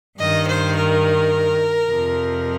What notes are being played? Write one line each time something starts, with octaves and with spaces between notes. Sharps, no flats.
G2 D#3 D#5
C5
A#4
F2 C3 F3